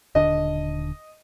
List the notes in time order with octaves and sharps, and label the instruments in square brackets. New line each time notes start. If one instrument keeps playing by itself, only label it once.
[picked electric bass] D#1 D3 D4 [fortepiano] D#5